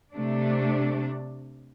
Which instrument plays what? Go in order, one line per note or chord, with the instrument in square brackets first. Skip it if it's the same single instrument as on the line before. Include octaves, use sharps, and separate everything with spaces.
[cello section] C3 A3 D4